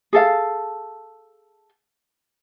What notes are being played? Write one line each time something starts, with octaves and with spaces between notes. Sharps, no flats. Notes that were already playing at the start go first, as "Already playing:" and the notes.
G#4 A4 F5